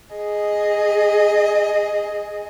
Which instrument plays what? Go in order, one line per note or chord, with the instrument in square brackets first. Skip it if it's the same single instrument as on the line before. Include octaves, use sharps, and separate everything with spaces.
[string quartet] G#4 D#5